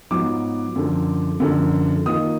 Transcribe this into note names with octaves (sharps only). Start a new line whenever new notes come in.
G#2 F#3 B3 F4 D6
F#2 D3 F3
F#2 D3 F3
D#3 A#3 F4 D#6